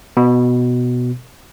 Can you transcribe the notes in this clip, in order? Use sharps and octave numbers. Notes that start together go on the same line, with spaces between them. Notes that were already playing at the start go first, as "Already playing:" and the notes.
B2